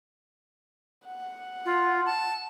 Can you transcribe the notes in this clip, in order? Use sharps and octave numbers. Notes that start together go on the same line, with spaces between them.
F#5
F4
A5